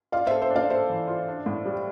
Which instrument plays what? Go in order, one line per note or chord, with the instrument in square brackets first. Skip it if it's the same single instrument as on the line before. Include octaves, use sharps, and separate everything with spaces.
[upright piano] F4 [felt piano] D5 F5
[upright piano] A4 [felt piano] C5 E5
[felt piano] C5 E5
[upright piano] D4
[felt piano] D5 F5
[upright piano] A4 [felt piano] C5 E5
[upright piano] E3
F4
D4
A2
G3